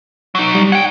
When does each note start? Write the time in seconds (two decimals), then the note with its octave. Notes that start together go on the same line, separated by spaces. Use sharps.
0.35 F#3 D#4
0.55 G3
0.72 F#5 G5 G#6